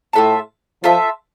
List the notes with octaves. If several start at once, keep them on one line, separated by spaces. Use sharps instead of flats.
A2 F4 A4 E5 A5
F3 F4 A4 E5 A5